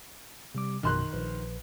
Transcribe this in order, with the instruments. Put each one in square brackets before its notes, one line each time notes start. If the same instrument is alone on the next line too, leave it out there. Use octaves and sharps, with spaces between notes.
[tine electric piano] C3 G3 D6
[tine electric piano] A#1 F#2 B2 [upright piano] D#3 C6 F#6
[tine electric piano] A#1 B4